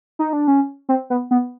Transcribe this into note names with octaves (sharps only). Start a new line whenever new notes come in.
D#4
D4
C#4
C4
B3
B3